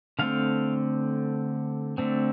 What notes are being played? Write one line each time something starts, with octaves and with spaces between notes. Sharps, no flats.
D3 A3 C4 F5
D3 A3 C4